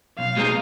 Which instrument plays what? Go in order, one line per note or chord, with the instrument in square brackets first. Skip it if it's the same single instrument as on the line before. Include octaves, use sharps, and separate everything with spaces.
[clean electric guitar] B1 [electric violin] F5
[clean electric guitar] B2 G#3 C4 D#4